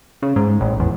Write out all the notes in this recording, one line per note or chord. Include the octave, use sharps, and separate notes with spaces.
C#3
G#2
A1
E2